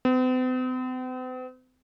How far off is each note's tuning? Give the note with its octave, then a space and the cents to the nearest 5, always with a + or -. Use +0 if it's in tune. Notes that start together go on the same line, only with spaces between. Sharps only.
C4 -45